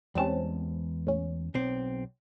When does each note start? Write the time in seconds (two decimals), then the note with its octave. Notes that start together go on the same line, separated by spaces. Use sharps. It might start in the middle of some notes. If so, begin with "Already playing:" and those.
0.15 E2 G3 G#3 C4 C#4 A5
1.07 A2 C#4
1.54 B1 C4